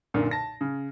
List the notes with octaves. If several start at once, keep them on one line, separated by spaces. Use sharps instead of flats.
B1 F#2 A#2 D3
A5 A#6
C#3